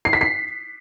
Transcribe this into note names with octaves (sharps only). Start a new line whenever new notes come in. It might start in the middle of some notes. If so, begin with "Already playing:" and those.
C7
B6
C7